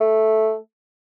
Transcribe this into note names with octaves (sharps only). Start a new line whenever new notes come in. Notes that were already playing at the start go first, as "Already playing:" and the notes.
A3